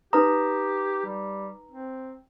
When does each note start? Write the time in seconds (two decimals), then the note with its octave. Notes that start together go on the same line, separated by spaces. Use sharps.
0.13 D#4 G4 B4 A#5 D#6
1.05 G3
1.71 C4